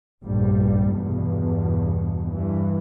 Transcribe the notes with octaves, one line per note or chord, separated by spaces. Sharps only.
F1 A#1 G2 G3
E2 G2 B2
G2 E3